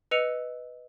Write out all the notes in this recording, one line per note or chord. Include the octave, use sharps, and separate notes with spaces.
B4 D#5 E6 C#7 D#7 F7